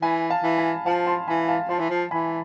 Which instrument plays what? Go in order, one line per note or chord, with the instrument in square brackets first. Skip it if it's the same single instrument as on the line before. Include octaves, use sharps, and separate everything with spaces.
[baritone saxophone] E3 [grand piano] G#5 B5
[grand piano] F5 A5
[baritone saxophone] E3
[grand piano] G#5 B5
[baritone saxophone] F3 [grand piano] F5 A5
[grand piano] A5 C6
[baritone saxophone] E3 [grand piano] G#5 B5
[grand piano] F5 A5
[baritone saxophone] F3 [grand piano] A5 C6
[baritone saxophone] E3
F3
[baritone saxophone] E3 [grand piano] G#5 B5